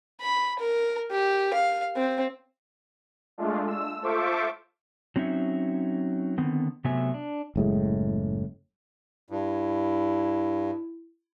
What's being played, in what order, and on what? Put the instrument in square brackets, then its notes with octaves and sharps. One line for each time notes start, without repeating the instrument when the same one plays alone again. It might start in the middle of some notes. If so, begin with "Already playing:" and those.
[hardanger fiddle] B5
A#4
G4
F5
C4
[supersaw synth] G#3 A3 D4 F4
E6
F4 A4 C5 E5 C#6 D6
[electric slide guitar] F#3 C4 C#4 D#4 E5
D3 D#3 B3 C4
C3 F#3 A3 B3 E5 G#5
D4
[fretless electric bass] F#1 A2 G#3
[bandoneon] G2 [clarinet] E4